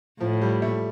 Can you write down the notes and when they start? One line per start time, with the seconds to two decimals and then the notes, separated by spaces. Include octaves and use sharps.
0.20 A2 F3
0.42 G3
0.62 A3